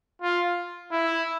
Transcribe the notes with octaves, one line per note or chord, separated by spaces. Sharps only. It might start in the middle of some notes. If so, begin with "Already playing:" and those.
F4
E4